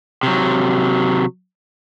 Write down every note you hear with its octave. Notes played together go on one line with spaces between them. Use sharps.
C3 F#3